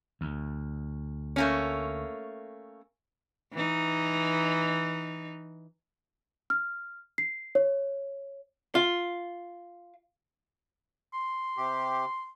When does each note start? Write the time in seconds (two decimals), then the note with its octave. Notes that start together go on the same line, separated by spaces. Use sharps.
0.21 D2
1.36 A3 A#3 C#4
3.53 E3 D#4
6.50 F6
7.18 C7
7.55 C#5
8.75 F4
11.13 C6
11.57 C3 G4